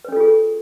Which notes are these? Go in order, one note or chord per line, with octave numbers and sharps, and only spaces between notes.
C#4 F4 G#4 A4 B4